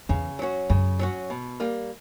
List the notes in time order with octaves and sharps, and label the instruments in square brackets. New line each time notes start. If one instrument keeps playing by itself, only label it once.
[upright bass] E2 [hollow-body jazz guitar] C#3
[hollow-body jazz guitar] F#3 C#4 F#4
[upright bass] F#2 [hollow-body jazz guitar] C#3
[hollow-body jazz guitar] F#3 C#4 F#4
B2
G3 A#3